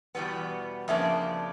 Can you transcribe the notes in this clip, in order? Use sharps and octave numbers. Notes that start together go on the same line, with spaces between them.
E2 B2 G3 B3
F2 C#3 F3 A#3 D4 E5